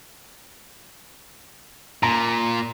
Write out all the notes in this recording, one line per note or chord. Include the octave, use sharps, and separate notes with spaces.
A#2 A#5